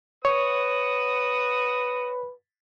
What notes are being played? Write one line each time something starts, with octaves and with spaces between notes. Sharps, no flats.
F#4 B4 C#5 F#5 D#6